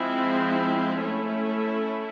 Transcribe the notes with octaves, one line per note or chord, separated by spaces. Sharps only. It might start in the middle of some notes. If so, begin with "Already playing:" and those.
Already playing: F3 G#3 C4 E4
A3 C#4 E4